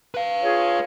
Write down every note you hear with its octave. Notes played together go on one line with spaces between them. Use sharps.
B4 F5
F4 G#4 C#5